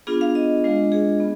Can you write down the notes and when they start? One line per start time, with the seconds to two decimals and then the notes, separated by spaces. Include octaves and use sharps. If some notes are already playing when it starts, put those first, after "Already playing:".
0.07 B3 D4 F4 G#4
0.21 F5
0.35 D#5
0.64 G#3 D4 F4
0.92 G#4
1.20 B3